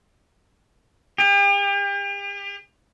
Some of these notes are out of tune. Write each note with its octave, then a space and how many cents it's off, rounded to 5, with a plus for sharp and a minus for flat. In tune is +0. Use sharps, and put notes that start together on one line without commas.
G4 +40